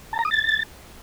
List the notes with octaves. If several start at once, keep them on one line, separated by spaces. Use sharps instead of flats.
A5
A#5
D#6
A6